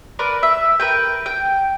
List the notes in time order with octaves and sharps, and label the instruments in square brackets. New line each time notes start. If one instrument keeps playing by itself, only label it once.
[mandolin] A#4 B4 D5
E5
A#4 B4 G5
G5